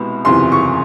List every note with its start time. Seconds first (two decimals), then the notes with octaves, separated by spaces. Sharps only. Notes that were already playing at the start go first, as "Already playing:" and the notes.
Already playing: C2 B2 G#3 B3 B5
0.25 F#1 E2 C3 F3 C6
0.52 C#6